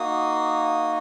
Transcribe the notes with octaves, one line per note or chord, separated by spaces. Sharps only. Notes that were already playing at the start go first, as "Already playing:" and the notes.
Already playing: A#3 D#4 F#4 D#6